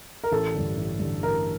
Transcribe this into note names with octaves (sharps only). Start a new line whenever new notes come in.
A#4
A1 A4
G2 D3
A1
G2 D3
A1 A#4